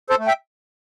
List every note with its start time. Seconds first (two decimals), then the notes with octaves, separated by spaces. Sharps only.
0.10 A4 C5
0.19 A3
0.27 E5 G5